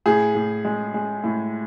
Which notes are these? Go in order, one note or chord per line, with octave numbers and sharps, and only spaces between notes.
A2 G#4
A2
G#3
G#3
A2